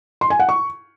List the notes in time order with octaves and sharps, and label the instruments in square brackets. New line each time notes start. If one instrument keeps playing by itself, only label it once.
[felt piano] C6
G#5
F#5
C#6